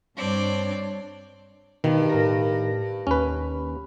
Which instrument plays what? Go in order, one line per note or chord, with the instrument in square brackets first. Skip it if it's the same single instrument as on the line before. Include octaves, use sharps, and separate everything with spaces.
[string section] G2 D4 C#5 [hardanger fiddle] C4 D5
[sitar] G2 [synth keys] B2 [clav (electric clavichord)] D#3
[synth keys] A2 A#4 A#6
[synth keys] D#2 [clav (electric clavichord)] C#4 B4